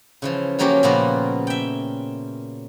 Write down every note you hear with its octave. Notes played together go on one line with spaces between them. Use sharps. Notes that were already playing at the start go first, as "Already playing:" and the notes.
C#3 E3 F3
C#3 F3 F#3 A#3 C#4 G4
A#2 C#3 F3 A#3 B3 F#4
E5 G5